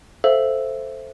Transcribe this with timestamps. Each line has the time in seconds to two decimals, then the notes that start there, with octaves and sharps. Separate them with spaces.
0.24 A4 C5 E5 F5